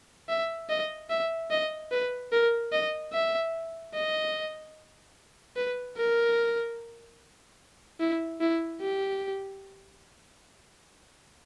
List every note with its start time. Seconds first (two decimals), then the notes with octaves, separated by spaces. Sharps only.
0.29 E5
0.69 D#5
1.10 E5
1.51 D#5
1.92 B4
2.32 A#4
2.73 D#5
3.13 E5
3.95 D#5
5.56 B4
5.97 A#4
8.00 E4
8.41 E4
8.81 G4